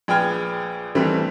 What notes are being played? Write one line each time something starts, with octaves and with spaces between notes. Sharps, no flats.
A#1 G#4 B4 G5 F6 G#6
D#3 E3 G3 A3 C4